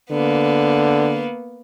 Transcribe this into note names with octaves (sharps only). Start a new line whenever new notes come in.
D3 A#3 B3